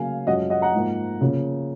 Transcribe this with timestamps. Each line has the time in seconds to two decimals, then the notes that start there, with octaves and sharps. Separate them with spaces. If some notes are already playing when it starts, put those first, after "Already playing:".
Already playing: C#3 F#3 A#3 F5 G#5
0.27 F#2 F3 G#3 C#4 D#5 F#5
0.50 D#5 F#5
0.62 F#5 A#5
0.74 G#2 F3 A#3
1.21 C#3 F3 A#3 C#4